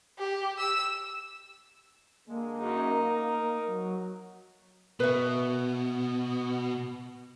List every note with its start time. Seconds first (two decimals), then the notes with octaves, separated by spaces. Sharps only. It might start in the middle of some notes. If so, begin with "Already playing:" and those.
0.19 G4
0.59 E6
2.27 D3 G#3 A#3
2.59 F#2 D#4
2.91 A#4
3.66 F#3
5.00 B2 B4 E5